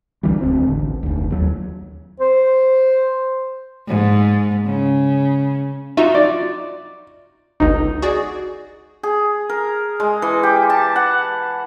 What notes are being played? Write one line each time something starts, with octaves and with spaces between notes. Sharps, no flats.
C#2 D3 E3 G3
E1 D2 C4
A1 D3
F1 D2
D#2 F#3
C5
G#2
C#3
D#4 F4 F#4 E5
D5
G1 C#2 D#4
F#4 G#4 D5
G#4
A#4
G#3
E3
G4
A5
F#5